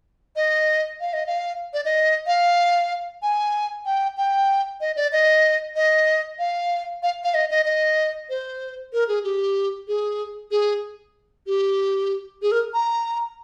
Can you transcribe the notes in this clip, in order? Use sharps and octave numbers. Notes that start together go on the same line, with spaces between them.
D#5
F5
D#5
F5
D5
D#5
F5
G#5
G5
G5
D#5
D5
D#5
D#5
F5
F5
F5
D#5
D#5
D#5
C5
A#4
G#4
G4
G#4
G#4
G4
G#4
A#4
A#5